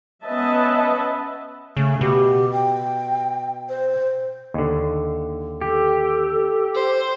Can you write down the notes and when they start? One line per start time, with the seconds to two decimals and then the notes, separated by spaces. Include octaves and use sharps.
0.25 B3 C#4 B4 D#5 E5 A5
1.77 C#3 A3
2.01 B2 G4
2.53 G5
3.69 C5
4.54 D#2 D3
5.61 G4 A4
6.75 C5